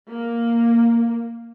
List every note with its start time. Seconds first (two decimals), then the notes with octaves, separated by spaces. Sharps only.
0.10 A#3